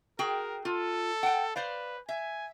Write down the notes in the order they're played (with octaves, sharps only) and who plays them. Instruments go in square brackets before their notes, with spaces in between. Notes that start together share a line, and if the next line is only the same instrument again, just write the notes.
[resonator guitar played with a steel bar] F#4 G#4 G5 [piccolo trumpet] A#4
[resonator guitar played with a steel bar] F4 [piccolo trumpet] A4
[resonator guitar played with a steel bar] F#5 G5
[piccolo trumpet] B4 [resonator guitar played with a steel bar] C5 D5 F5
[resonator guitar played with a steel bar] E5 [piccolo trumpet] G#5